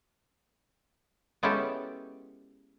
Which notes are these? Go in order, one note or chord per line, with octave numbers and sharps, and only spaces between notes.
G#3 B3 C#4 E4 G4 A4